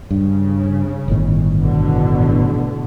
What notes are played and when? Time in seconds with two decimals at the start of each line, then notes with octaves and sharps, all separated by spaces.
0.11 G2 C#3
1.08 G1 A2 D#3
1.58 A1 B2 D3